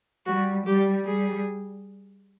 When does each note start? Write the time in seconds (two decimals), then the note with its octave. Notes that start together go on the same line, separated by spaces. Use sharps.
0.26 G3 F#4
0.66 G3 G4
1.05 G3 G#4